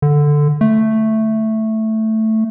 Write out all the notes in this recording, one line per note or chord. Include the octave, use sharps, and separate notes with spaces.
D3
A3